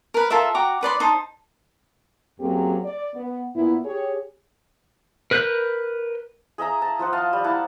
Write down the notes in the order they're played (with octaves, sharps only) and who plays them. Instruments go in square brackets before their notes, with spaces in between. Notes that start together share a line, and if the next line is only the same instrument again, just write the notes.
[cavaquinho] A#4 B4
F4 A4 A#4 E5
F#4 G5 A#5 D6
D#4 B4 D5 C6
D#4 C5 A5
[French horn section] F#2 F#3 A#3 C4 G4 G#4
D5
B3
A#2 B3 E4
G4 G#4 C#5
[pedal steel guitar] A#4 B4 F#6 G6
[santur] G#4 D#5 E5 A#5
A5
F3 C5 F#5
D#5 F5 A5
G3
A#3 E4 F#5 A5